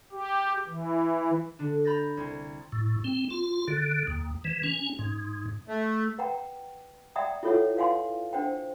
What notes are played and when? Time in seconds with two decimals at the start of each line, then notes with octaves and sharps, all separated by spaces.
0.12 G4
0.67 E3
1.59 D3 D4
1.85 A#5 B5 G6 A6 A#6
2.17 C2 G#6
2.72 A2
3.04 C4
3.30 F4
3.68 D3
4.07 D#2
4.44 E3
4.63 C#4
4.99 G#2
5.68 A3
6.18 B4 F#5 G5 A#5
7.16 D5 E5 F#5 G5 A#5 D#6
7.43 E4 F4 A4 C#5 E5 F#5
7.76 B4 F5 F#5 G#5 C6
8.33 D4 C5 F#5 G5